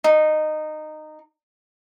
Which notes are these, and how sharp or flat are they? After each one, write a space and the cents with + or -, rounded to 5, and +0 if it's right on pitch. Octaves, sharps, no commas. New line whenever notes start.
D#4 -15